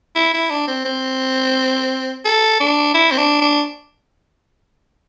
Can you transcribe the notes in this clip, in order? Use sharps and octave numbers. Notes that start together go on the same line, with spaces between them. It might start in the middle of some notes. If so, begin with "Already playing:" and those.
E4
E4
D4
C4
C4
A4
D4
E4
C4
D4
D4